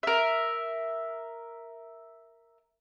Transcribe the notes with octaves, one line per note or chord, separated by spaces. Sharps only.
A#4 E5